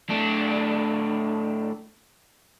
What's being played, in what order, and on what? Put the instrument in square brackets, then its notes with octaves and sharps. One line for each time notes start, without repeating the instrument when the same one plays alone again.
[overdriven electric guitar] A2 D4